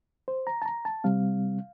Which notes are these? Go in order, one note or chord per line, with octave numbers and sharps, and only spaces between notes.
C5
A#5
A5
A#5
A5
C3 G3 C4 F5